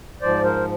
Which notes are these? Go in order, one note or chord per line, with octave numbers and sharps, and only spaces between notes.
G#2 F3 C5 D5
A#4 C5